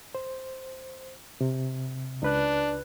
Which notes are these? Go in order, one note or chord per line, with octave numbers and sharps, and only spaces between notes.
C5
C3
C#2 D4 B4 F#6